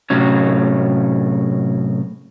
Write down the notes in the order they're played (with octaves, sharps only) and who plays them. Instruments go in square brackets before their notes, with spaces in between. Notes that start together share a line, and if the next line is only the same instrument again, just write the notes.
[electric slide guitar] A2 C3 F#3 C#4